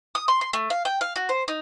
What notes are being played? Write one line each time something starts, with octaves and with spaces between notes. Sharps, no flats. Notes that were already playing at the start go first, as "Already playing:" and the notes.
D#6
C6
C6
A3
F5
G5
F5
F#4
C5
D#4